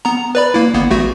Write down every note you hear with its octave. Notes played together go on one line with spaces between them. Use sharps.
B3 A#5
B4 D5 B5
A#3 E4
G1 A#3 B3
A1 A3 F#4